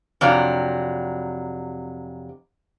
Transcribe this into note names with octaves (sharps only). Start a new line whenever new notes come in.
F2 C3 F#3 D4